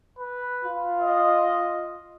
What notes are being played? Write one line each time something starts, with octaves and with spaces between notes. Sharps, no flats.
B4
F4
D#5